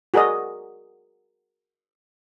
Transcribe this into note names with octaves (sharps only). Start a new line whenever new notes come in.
F#4 G#4 A#4 D5 D#5